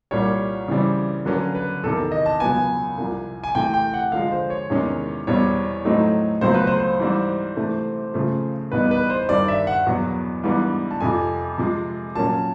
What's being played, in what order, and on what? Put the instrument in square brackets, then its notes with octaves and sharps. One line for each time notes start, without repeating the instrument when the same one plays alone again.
[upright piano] C2 A#2 G3 [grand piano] C#5
[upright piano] C#3 E3 G3 C4
[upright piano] D3 F#3 A#3 C#4 [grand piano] B4
[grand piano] B4
[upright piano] E2 C3 D#3 [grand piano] A4
[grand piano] D#5
A5
[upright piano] C#2 B2 F#3 B3 [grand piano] G#5
[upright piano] C2 C3 F3
[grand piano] G#5
[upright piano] C3 E3 A3 [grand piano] G5
[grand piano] G5
F#5
[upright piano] D3 F3 G#3 [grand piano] F5
[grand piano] C5
C#5
[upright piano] E2 C3 D#3 G#3 C#4
[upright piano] E2 B2 G3 C4 [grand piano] C#5
[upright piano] A2 F#3 A3 C4 D#4
[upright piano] C#2 B2 F#3 A3 C4 [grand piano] C5
[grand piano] B4
C5
[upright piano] G#2 E3 G3 C4
C3 E3 A3
C#3 F3 A3
[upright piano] E2 B2 G3 B3 D#4 [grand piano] B4
[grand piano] B4
C5
[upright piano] G2 D#3 G3 C4 [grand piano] D5
[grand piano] E5
F#5
[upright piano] E2 B2 F#3 B3
G#2 E3 G3 B3 D4
[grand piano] A5
[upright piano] F2 C3 F3 [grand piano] G#5
[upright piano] C3 F3 G#3
[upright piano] A#2 F#3 A#3 C#4 [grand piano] A5